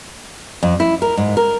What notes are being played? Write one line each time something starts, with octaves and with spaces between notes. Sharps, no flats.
F2
E4
A#4
G#2
A#4